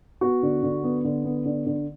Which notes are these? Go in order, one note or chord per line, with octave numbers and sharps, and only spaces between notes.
B3 F#4
D3
D3
B3
D3
B3
D3
D3